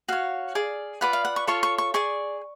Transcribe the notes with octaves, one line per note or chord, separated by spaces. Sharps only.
F#4 C#5 F5
G#4 D5
F4 B4 D5 F#5
F5
F#5
C#6
F4 A4 C#5 C#6
C#6
C#6
G#4 D5 C#6